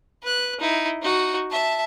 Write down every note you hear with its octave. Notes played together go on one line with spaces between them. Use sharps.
B4 F#6
D#4 E4
D#4 F#4
E5 A5